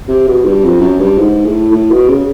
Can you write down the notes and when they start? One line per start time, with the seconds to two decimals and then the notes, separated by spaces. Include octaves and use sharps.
0.08 C3
0.27 B2
0.45 G2
0.63 F2
0.81 F#2
0.99 G2
1.18 G#2
1.45 A2
1.72 A2
1.90 B2
2.08 C#3